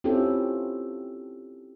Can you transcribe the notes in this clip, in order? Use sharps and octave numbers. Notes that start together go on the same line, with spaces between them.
C4 C#4 E4 F4 G4 A4